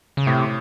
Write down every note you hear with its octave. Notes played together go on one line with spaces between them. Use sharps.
C#3
A2 C3